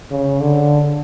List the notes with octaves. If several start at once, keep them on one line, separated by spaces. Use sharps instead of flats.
C#3
D3